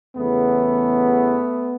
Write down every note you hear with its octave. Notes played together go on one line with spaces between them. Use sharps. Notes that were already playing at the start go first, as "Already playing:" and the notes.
E2 C#3 E3 A3 B3